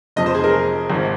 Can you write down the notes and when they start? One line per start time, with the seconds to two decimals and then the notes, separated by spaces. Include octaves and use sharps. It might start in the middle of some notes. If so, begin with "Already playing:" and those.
0.16 F1 F2 C3 F3 D#5
0.26 C5
0.35 G#4
0.44 A#4
0.90 G#1 G#2 F3